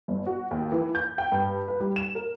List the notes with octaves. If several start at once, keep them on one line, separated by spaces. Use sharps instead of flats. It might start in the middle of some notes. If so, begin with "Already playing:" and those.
G1
F#4
D#2
E3
G6
G5
G2
B4
G3
E7
A#4